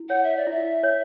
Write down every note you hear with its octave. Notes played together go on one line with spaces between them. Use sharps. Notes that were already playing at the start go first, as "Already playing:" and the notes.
Already playing: E4
C#5 F#5
E5
D5
E4 E5
C#5